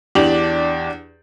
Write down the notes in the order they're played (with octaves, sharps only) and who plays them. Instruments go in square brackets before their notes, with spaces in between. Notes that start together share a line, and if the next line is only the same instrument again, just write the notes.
[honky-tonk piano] E2 D4 G4 D5 F7 F#7